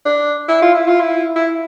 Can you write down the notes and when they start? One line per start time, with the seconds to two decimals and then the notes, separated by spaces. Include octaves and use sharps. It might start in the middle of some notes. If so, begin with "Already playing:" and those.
0.05 D4
0.48 E4
0.62 F4
0.74 E4
0.88 F4
1.00 E4
1.36 E4